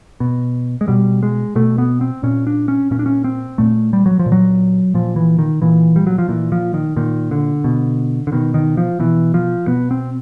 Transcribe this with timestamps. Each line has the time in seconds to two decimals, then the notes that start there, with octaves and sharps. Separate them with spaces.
0.20 B2
0.81 G#3
0.88 B2 G3
1.23 G#3
1.55 B2 A3
1.78 B3
2.01 C4
2.23 A#2 C#4
2.47 D4
2.68 C#4
2.91 A#2 C#4
2.99 D4
3.06 C#4
3.24 C4
3.58 A#2 A3
3.93 G3
4.06 F#3
4.19 F3
4.26 A#2
4.32 F#3
4.94 A#2 F3
5.16 E3
5.39 D#3
5.62 A#2 E3
5.96 G3
6.07 F#3
6.18 F3
6.29 A#2 E3
6.52 F3
6.74 D#3
6.96 A#2 D#3
7.31 D3
7.64 B2
8.27 D3
8.32 B2 D#3
8.54 D#3
8.77 F3
9.00 B2 E3
9.34 F3
9.67 B2 B3
9.91 C4